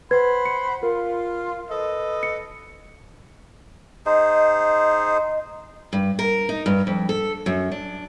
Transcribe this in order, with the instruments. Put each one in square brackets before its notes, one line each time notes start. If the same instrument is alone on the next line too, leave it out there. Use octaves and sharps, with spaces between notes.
[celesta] B4 G#6 [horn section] C5 F#5 B5
[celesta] C#7
[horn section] F4 [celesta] A#4
[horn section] A4 B4 D#5
[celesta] C#7
[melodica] D#4 G#4 C5 [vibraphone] D#5
[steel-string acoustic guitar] G2
A#4
D#4
G2
F2
A4
F#2
D4